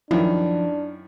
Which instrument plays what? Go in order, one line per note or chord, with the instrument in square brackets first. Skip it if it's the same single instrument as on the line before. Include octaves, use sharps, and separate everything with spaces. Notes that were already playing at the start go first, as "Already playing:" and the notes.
[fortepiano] F#2 D#3 [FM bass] F3 [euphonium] D4 [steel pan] E4